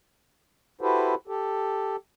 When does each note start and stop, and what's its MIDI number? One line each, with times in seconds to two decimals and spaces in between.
0.81 1.15 64
0.81 1.15 66
0.81 1.15 67
0.81 1.15 69
0.81 1.15 71
0.81 1.15 72
1.28 1.96 67
1.28 1.96 69